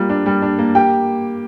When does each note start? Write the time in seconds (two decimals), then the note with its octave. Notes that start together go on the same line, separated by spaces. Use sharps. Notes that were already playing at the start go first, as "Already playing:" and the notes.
Already playing: G3 A#3 F4
0.09 D4
0.26 G3
0.42 D4
0.59 A#3
0.75 G4 G5